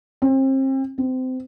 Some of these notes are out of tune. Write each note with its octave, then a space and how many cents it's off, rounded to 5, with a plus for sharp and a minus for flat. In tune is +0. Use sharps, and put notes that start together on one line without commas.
C4 +35
C4 -25